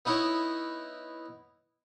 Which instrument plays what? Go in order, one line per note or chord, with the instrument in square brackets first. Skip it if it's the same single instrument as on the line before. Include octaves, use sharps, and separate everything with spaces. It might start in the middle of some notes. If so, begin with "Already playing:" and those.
[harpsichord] B3 D#4 E4 C#5